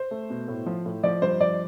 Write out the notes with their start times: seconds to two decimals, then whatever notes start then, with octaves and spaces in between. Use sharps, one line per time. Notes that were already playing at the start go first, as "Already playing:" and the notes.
Already playing: C5
0.11 A3
0.30 B2
0.48 A2
0.66 F3
0.86 A2
1.03 F3 D5
1.22 G2 C5
1.41 F3 D5